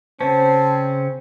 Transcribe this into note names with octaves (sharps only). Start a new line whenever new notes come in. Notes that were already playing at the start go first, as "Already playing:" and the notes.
C#3 C4 C#4 C5 A5